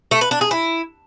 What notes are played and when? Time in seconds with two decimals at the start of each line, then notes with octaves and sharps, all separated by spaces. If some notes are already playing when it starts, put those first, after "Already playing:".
0.11 A3
0.21 B4
0.31 D4
0.41 G#4
0.51 E4